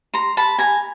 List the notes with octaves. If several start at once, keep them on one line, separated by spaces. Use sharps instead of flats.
A#5 C6
A5 B5
G#5 A#5